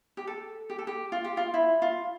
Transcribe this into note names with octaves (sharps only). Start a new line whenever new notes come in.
G4
A4
G4
A4
G4
F4
G4
F4
E4
F4